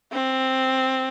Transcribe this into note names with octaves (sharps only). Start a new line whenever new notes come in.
C4